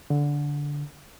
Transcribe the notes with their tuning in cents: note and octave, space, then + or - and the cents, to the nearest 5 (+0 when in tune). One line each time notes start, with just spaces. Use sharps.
D3 -15